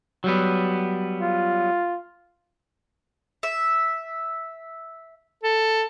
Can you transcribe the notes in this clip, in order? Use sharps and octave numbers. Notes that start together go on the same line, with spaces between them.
F#3 G3 B3
F4
E5
A4